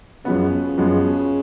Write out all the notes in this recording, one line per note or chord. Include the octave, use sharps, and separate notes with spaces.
F#2 C#3 F3 G#3 B3
F#2 F3 G#3 B3